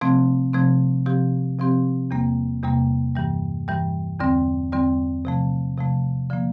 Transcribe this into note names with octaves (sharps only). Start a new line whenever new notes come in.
C3 F3 A3 C4
C3 F3 A3 C4
C3 F3 C4 G4
C3 F3 C4 G4
E2 C3 G3 A#3
E2 C3 G3 A#3
G2 E3 G3
G2 E3 G3
E2 D3 G3 C4
E2 D3 G3 C4
C3 F3 A3
C3 F3 A3
D3 F3 A#3